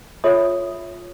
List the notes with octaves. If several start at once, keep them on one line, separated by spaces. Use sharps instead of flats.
F4 A4 C#5 E5 D#6